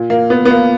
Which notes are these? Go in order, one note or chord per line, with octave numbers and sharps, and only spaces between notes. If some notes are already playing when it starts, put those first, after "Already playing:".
Already playing: A#2
A#3
B3
B3
A#3